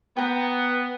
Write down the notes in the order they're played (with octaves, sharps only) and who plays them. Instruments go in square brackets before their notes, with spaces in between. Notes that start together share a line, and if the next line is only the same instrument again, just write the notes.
[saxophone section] B3 [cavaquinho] G5 A#5